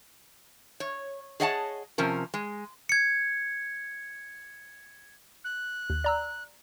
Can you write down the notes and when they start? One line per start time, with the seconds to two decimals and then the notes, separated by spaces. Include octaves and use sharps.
0.80 C#5
1.40 G#4 C#5 D#5 F#5 G5 A5
1.98 C3 F3 C#4 A#4
2.34 G#3
2.89 G#6 C#7
5.44 F#6
5.90 D#2
6.04 D5 A#5 E6